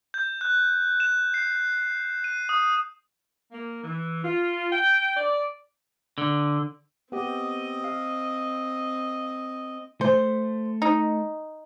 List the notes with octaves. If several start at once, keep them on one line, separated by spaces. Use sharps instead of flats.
G6
F#6
E7
C7
D#7
D#6
A#3
E3
F4
G5
D5
D3
B3 C4 G4 D#5
F5
A3 C5
D#4